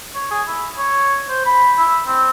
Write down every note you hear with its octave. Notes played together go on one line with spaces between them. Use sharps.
C#5
G#4
E4
C#5
C5
B5
E4
C4